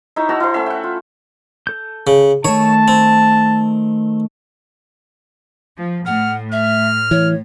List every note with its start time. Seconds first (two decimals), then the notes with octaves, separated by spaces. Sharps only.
0.16 D#4 E4 C#5 E5
0.29 F#4 A5 A#5 E6
0.40 E4 C5
0.54 A3 C#4 E5
0.66 F#5 G5
0.84 F4
1.67 A4 G6
2.07 C#3
2.45 D#3 A3 C#5 A5
2.88 C4
5.77 F3
6.06 A2 F#5 F6
6.52 E5 F6
7.11 E3 C#5